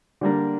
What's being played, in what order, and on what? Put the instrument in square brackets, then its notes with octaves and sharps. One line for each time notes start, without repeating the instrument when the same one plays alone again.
[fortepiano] D3 G3 A#3 D4